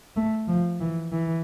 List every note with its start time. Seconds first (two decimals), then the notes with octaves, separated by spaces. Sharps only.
0.16 A3
0.48 F3
0.80 E3
1.12 E3